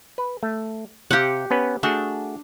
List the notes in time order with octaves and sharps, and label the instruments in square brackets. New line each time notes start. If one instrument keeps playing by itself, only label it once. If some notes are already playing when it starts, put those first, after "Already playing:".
[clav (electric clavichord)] B4
A3
[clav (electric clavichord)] C3 F5 [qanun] G4 F#5
[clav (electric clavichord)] B3 C#4 B4
[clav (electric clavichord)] A3 F#4 G#4 [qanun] D4